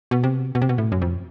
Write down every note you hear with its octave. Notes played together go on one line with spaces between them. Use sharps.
B2
C3
B2
C3
B2
A2
F#2
F2